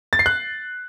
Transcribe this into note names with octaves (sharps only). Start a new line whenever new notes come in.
A6
C7
F#6